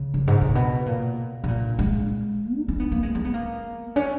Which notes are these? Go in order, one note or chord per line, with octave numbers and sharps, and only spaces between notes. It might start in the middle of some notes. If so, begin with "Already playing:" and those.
Already playing: C#3
F#2
G#2
A#2
B2
A#2
B2
A#2
G#3
D#4
C#4
B3
A#3
G#3
C#4
B3
A#3
C#4